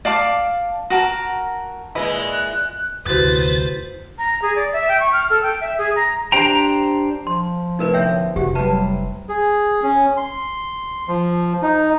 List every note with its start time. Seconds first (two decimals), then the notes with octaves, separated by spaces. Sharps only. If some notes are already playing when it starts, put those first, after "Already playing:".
0.05 D5 F5 A5 D6
0.90 F#4 A#4 A5
1.95 A#2 G#3 E4 B4 D#5
2.33 F#6
3.06 F1 D2 E4 F#4 G4 B4 C5 A6
4.18 A#5
4.42 G#4
4.56 D5
4.73 E5
4.89 G5
5.00 C#6
5.13 F6
5.30 A4
5.43 G5
5.61 E5
5.78 G#4
5.96 A#5
6.32 D4 G4 C5 G5 A#5
7.27 F3 C6
7.79 A2 C3 D#4 E4 A#4 B4
7.94 B2 D3 C#5 E5 G5
8.36 F1 F#4 G4
8.55 F#3 G3 E4 B4 C5 A5
9.29 G#4
9.83 C#4
10.17 C6
11.08 F3
11.62 D#4